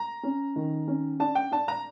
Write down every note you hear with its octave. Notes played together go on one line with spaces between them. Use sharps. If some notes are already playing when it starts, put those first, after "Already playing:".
Already playing: A#5
C#4
D#3
C#4
D4 A5
G5
D4 A5
A#5